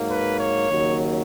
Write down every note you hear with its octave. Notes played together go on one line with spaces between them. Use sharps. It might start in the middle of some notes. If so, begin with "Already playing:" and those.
Already playing: G#2 F#3 A#3
B4
C#5
D#2 C#3 F#3 A#3